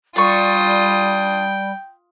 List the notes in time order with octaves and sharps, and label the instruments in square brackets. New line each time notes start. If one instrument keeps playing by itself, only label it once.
[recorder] G3 [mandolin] D4 C#6 [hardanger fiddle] F4 D#6 [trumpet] G5